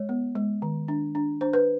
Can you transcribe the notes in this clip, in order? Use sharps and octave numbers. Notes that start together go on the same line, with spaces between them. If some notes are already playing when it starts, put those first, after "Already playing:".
Already playing: G#3 C#5
B3
G#3
D#3
D4
D4
D4 C5
B4